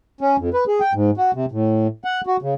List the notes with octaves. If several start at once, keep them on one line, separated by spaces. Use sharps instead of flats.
C#4
F2
B4
G#4
G5
G#2
F#4
C3
A2
F#5
F#4
C#3